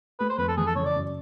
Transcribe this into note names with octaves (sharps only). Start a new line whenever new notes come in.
A3 B4
C5
F2 B4
A4
E3 G#4
A4
C#3 C#5
D5
F#2